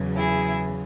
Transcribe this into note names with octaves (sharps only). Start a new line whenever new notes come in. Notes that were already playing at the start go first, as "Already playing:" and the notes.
Already playing: E2 C#3 F#3
E4 G#4